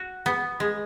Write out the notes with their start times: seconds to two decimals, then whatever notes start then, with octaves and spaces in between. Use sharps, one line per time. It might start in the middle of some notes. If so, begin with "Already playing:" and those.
Already playing: F#4
0.26 B3
0.60 G#3